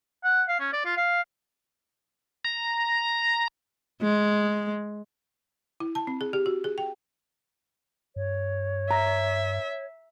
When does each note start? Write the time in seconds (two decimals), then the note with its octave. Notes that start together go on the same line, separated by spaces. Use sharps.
0.24 F#5
0.48 F5
0.60 C#4
0.73 D5
0.85 F4
0.97 F5
2.45 A#5
4.02 G#3
5.80 E4
5.95 A5
6.07 C4
6.21 G#4
6.33 G4
6.46 F#4
6.64 G#4
6.78 G5
8.16 G2 C#5
8.91 E5 A#5